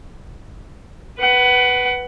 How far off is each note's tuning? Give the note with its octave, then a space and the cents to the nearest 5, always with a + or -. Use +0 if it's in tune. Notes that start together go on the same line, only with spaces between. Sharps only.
B4 +0 F#5 +25